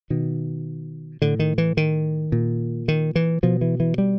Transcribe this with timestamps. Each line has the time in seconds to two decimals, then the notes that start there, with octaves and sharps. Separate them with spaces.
0.10 B2 D#3
1.22 A2 D3
1.39 D#3
1.58 E3
1.77 D#3
2.32 A#2
2.88 D#3
3.16 E3
3.43 B2 F3
3.61 E3
3.80 E3
3.98 G3